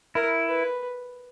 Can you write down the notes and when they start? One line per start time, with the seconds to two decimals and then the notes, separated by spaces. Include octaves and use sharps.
0.15 E4 A#4
0.47 B4